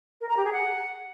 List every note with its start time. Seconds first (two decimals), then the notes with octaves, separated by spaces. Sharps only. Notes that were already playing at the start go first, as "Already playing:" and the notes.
0.21 A#4
0.29 A#5
0.37 G4
0.45 G#4
0.53 F#5